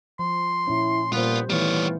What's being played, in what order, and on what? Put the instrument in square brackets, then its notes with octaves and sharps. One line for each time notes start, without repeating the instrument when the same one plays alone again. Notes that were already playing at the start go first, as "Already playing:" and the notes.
[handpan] F3 [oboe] C6
[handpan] A#2 C#4 [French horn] E4
[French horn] A#2 [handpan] G3 C5 [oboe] B3 [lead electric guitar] F4
[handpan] D#3 A3 B3 [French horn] E3 [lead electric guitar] G3 C#5 [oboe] F4